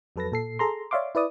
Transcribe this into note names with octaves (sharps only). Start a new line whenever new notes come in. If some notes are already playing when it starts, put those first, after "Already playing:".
F2 F#3 A4 B4 A5 A#6
A#2 A4 C7
G#4 A4 A#5 C6
C#5 D5 E5 F5 C6 D6
E4 B4 D5 D#6